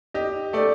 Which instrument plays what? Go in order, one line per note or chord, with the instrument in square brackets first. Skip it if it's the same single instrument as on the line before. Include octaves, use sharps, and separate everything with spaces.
[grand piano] G4 [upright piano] D#5
[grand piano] A3 [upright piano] D5